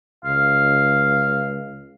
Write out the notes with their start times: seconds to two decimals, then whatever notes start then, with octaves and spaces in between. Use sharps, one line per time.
0.25 C#2 F5